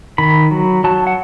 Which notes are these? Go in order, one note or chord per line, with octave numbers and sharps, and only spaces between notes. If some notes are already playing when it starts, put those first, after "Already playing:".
D#3 B5
F#3
F#3 A5
F#5